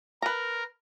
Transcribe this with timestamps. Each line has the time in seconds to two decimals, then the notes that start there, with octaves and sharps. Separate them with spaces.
0.22 A#4 B4 A#5